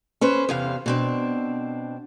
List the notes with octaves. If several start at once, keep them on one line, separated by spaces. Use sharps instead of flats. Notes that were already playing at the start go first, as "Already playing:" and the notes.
C#4 B4 C5
E2 C3 F5
B2 C4 D4